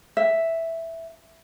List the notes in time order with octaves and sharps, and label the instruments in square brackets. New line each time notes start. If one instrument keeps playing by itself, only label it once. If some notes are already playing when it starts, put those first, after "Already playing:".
[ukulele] E5